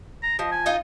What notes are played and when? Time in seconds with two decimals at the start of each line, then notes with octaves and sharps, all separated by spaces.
0.23 A#5
0.39 F3 D#5
0.52 G#5
0.66 D#4 F4 D#5